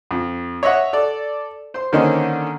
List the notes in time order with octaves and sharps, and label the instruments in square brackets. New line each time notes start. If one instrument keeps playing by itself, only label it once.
[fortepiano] F2
C#5 D#5 E5 F#5
A4 D5
C5 C6
D3 D#3 A#3 C#4 D#4 C5